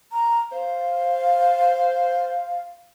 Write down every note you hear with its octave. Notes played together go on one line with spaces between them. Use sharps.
A#5
C5 F5